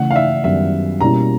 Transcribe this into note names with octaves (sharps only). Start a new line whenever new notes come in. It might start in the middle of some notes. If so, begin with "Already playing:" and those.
Already playing: C#3 E3 A3 C#4 F#5
F5
E5
F#2 D#3 G3 B3 E5
B2 G3 A#3 C#4 E4 A#5